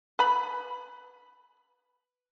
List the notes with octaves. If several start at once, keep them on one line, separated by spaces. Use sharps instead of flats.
B4 B5